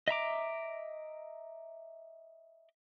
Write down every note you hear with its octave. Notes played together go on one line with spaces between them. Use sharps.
D#5 E5 A#5 D6